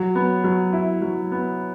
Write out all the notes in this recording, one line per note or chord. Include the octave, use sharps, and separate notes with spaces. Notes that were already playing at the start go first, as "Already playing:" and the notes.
Already playing: F#3
B3
F#3
E4
F#3
B3